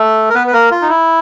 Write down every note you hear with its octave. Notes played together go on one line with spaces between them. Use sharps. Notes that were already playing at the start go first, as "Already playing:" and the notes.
Already playing: A3 A4
A#4
B3 B4
B4
A#3 A#4
F4
D#4
E4